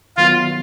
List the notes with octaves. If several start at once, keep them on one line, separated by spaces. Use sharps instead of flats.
D#3 F#3 B3 F4